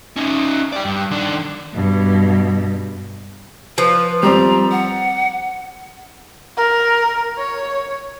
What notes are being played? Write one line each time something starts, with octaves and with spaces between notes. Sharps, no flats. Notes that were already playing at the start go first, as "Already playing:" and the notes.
C#4 D#4
D5 G5
G2
D#3 D4
G2 B2
F3 B4
G3 C4 A#5
F#5
A#4
C#5